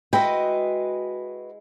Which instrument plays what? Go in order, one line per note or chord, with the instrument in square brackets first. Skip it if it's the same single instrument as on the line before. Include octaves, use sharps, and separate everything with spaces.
[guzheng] G#3 E4 [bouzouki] F#4 B4 D#5 [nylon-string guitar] G5